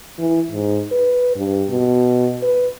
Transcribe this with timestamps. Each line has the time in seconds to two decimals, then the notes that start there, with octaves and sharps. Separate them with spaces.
0.19 E3
0.51 G#2
0.92 B4
1.36 G2
1.69 B2
2.43 B4